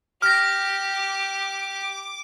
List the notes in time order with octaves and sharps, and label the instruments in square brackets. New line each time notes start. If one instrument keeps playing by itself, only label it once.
[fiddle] G4 [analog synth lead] D6 [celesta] F6 A#6